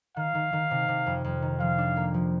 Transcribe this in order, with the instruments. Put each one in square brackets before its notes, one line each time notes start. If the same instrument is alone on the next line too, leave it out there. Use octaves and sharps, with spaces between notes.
[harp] D#3 [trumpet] F5
[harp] D#3
D#3
C3
C3
F2
F2
D#3
[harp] F3 [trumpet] F5
[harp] D4
A#3
F3